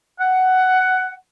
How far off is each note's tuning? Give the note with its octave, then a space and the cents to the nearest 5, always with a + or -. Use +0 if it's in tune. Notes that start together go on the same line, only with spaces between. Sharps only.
F#5 +10